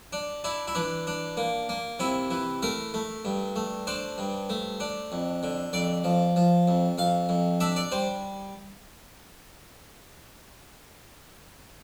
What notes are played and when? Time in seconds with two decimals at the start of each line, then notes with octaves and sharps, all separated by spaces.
0.13 D4
0.44 D4 E4
0.68 E4
0.75 E3 D4
1.07 D4
1.37 A#3
1.69 A#3
1.99 C3 E4
2.31 E3
2.62 A3 A#4
2.94 A3
3.25 G2
3.56 A3
3.87 D4 C5
4.18 G2
4.50 A3
4.80 D4
5.12 F2
5.43 D3
5.73 F2 D5
6.04 F3
6.36 F3
6.68 F2
6.98 F2 F5
7.29 F2
7.60 D4 E5
7.76 D5
7.92 G3 C5